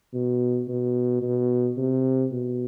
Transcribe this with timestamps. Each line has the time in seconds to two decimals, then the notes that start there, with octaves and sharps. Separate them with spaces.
0.14 B2
0.68 B2
1.22 B2
1.77 C3
2.31 B2